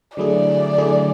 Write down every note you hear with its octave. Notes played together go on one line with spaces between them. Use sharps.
D3 F#3 A3 E4 G#4 D5
D3 F#3 A3 E4 G#4